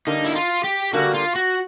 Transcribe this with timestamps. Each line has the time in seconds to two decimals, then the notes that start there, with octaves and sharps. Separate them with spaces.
0.07 D3 G3 A#3 D4 D#4
0.25 E4
0.35 F4
0.64 G4
0.93 D3 G3 A#3 D4 F#4
1.14 F4
1.36 F#4